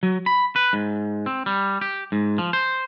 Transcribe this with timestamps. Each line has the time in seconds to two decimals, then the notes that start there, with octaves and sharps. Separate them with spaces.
0.03 F#3
0.26 B5
0.56 B4
0.73 G#2
1.26 C4
1.46 G3
1.81 G4
2.12 G#2
2.38 F3
2.53 C5